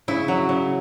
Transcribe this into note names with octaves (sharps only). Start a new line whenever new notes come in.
C#3 E4
F#3
C#3